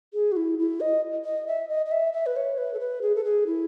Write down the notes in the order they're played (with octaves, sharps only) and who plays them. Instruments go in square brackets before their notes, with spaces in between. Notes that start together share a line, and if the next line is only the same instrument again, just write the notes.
[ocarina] G#4
F#4
E4
E4
D#5
D#5
E5
D#5
D#5
E5
E5
B4
C#5
B4
A4
B4
G#4
A4
G#4
E4